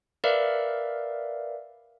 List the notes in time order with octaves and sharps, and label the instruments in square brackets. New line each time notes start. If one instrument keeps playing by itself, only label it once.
[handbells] A#4 B4 D5 E5 F5